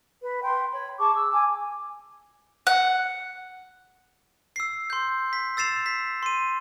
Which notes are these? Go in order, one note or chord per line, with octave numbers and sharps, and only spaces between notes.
B4
G5 C6
C#5 B5
G#4 A5 C#6 D6
E6
G#5 D6
F#5
E6 C7
C6 G6
B6
E6 A6 C7 E7 F7
B6
C6 D#7